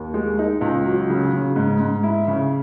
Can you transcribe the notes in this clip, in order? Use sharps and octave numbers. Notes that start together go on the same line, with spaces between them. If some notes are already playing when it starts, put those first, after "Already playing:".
Already playing: D#2
G#3
D#4
C#2
F#3
C#3
C#3
G#2
G#2
E4
C#3